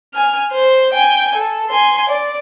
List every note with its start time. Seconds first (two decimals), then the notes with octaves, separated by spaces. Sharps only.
0.14 G#5 F6
0.52 C5
0.93 G5 G#5
1.35 A4
1.70 G#5 C6
2.09 D5